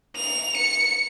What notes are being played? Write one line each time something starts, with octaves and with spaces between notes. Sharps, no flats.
F7
C#7